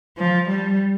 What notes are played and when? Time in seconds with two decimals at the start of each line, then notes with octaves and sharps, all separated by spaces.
0.17 F3
0.49 G3